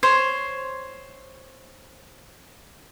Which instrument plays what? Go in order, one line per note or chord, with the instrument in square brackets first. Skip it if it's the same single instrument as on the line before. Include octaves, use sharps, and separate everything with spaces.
[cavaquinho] C5 C#5